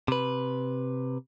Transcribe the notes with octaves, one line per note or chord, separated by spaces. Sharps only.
C3 B4